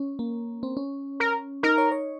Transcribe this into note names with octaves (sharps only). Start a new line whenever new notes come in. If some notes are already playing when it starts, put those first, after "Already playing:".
Already playing: C#4
A#3
C4
C#4
A#4
D#4 A#4
C#5
C#5